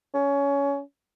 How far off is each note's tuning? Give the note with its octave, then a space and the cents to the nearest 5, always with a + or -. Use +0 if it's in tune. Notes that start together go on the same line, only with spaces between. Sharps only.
C#4 +20